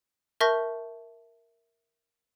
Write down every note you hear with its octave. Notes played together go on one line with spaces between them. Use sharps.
A#4 E5 A5 C#6 G6 A#6